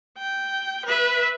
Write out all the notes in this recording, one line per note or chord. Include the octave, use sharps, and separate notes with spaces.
G5
B4 E5